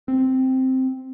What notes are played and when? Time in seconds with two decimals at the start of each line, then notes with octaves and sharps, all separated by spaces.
0.08 C4